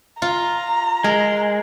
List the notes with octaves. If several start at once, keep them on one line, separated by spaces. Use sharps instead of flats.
F4 A#5
G#3 A#4